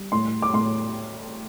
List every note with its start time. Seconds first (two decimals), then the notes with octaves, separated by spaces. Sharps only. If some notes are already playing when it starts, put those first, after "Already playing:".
Already playing: G3
0.12 A2 C6
0.42 D6
0.54 A2 C6